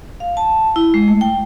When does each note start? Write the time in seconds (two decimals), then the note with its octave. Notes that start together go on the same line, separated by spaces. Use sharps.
0.20 F5
0.37 A5
0.76 E4
0.94 G#3
1.08 A3
1.21 G5